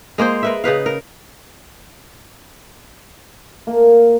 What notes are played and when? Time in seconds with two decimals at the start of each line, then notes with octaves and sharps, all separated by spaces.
0.18 G#3 A#3 G#4 C5
0.43 A#4 B4 E5
0.64 C#3 D#4 B4 F5
0.86 A#4
3.67 A#3